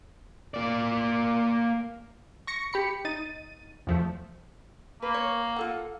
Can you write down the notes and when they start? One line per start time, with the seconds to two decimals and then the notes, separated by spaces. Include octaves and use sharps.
0.54 A#3 D5
2.47 C#6 A#6 C#7
2.73 G4 B5 C#7
3.05 D#4 A6 D#7
3.87 E2 F3 A3
5.02 A#3 B4
5.14 C#5
5.56 F4 A4 F#5